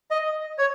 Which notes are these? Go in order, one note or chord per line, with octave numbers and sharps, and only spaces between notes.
D#5
C#5